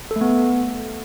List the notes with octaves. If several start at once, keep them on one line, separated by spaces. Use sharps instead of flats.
A4
A3
B3